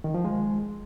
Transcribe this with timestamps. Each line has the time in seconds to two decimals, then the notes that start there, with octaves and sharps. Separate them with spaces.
0.04 D#3
0.14 F3
0.25 G#3